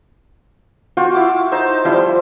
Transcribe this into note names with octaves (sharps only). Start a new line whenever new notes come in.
F4 F#4 G5 G#5
E4 D6
D#4 C5 A5
F3 G3 E4 C6